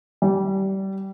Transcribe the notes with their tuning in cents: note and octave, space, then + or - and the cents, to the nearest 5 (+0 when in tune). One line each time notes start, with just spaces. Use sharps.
G3 -20